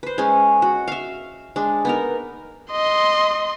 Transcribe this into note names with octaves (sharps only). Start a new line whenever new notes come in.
B4 C5
G#3 C#4
F#4
E5 F5
G#3 D4
B3 D#4 A#4
D#5 C6